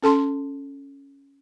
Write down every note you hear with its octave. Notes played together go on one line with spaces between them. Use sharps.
C#4 A4 A5 C6